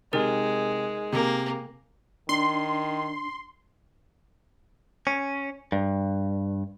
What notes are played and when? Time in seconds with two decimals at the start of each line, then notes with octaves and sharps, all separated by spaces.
0.13 C3 G#3 D#4 A#4
1.13 C3 A#3
2.29 D#3 D4 C6
5.07 C#4
5.72 G2